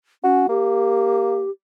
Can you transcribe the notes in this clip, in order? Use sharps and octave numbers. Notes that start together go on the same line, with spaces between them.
C#4 F#4
A#3 G4